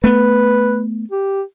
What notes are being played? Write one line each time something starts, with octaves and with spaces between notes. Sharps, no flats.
A3 B3 B4
G4